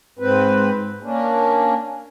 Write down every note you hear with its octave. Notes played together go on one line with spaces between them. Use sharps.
G#2 C4 B4
A#3 C#4 D4